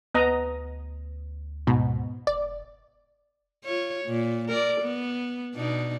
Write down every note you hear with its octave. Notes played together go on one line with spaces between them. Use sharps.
D2 B3 D#5 A#5
G#2 B2
F1 D5
F4 C#5
A#2
A#4 D5
B3
B2 D4 D#4